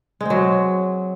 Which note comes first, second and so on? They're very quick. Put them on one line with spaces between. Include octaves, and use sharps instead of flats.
G#3 C4 F#3